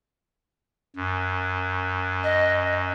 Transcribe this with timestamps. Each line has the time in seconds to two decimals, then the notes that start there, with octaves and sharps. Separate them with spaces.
0.96 F#2
2.23 D#5